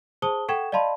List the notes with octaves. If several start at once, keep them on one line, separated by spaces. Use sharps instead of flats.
G#4 C5 A5 D#6 G7
A4 F#5 G5 C#6 G#6 E7
D5 D#5 F5 A5 B5 C6